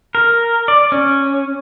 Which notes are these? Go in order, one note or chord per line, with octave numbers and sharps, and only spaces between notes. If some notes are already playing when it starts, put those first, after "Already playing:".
A#4
D5
C#4